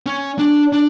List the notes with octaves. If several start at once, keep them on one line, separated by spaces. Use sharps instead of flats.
C#4
D4
D4